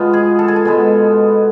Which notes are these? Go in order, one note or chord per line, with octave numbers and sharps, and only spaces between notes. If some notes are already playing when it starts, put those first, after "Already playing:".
Already playing: B2 G#3 B3 F4
G#4
A4
G#4
A4
B2 G#3 B3